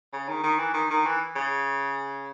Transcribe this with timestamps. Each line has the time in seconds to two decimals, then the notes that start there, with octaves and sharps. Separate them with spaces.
0.13 C#3
0.28 D#3
0.44 D#3
0.59 E3
0.74 D#3
0.90 D#3
1.06 E3
1.36 C#3